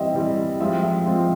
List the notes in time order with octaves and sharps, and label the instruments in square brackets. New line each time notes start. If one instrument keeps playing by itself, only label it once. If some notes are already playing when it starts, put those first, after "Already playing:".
Already playing: [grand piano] E3 G3 C4 [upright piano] D#5 E5
[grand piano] E3 G3 C4
[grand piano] F3 G#3 C4 F4 [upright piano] E5
[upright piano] E5
[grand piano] F3 G#3 C4 F4